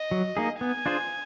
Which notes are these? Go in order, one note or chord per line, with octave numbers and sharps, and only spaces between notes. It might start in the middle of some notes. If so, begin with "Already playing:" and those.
Already playing: D#5
F#3
A#3 D#4 G#4
B3 G#5
D4 F4 G#4 C5